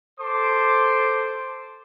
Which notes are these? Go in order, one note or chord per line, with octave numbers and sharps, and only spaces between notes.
A4 C5 C6 D6